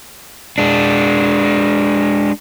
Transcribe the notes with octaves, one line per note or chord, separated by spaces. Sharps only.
G#3 D4